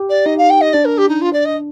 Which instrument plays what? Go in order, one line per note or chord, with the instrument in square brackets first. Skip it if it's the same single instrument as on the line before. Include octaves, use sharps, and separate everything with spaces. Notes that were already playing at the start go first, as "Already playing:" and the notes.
Already playing: [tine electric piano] G4
[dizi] D5
[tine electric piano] D#4 [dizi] D#5
[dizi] F5
G5
D#5
[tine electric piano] D4 [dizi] D5
[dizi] A#4
G4
D#4
F4
D5
D#5